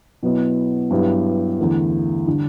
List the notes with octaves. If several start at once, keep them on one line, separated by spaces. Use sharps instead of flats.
B2 F#3 B3 E4
G2 F#3 B3 E4 G4
E2 D3 A3 E4
D3 G3 D4